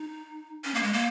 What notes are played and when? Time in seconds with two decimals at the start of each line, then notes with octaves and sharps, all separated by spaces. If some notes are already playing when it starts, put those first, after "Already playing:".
Already playing: D#4
0.64 C#4
0.75 A#3
0.83 G#3
0.93 A#3